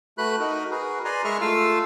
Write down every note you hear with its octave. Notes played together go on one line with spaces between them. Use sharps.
A3 F#4 B4 B5 F#6
D#4 F#4 A#4
F#4 G#4 A#4 B4
B4 D5 G#5 A#5 C6
G#3 G#4 A#4 E5 C#6 F6
A3 F4 F5 E6